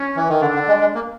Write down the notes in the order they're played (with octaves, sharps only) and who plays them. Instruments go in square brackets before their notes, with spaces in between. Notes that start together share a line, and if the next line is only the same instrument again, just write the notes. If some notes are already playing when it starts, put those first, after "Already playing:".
Already playing: [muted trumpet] C#4
[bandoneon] E3
D#3
[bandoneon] D3 [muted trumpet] D4
[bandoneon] D3
G#3
G#3
A#3